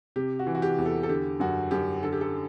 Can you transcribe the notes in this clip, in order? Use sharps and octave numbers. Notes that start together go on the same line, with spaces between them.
C3 G4
F#4
E3
F#4
G4
E2
A4
A4
D3 G4
F#2 F#4
F#2 G4
D3 A4
G4
A4